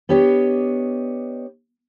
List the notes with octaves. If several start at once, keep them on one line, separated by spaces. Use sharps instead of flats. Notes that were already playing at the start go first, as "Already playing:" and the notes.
B3 D4 G4 C#5 D#5